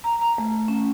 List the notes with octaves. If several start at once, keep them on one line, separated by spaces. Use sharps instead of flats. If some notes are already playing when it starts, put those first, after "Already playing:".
A#5
A#5
A3
C#4